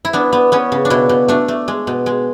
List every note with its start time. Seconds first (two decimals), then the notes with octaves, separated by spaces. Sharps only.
0.05 E4
0.13 B3 D4
0.33 B3
0.52 B3 C#4
0.72 C#3
0.85 D4
0.90 B2 E4
1.09 B2
1.28 A3 D4
1.48 A3
1.68 G#3
1.87 B2
2.06 G#3